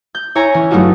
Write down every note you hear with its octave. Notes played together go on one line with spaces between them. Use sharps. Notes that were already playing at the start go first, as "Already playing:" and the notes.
G6
E4 C#5 G#5 A#5
E3 C#4
G2 F#3 A3 D#4 F4 F#4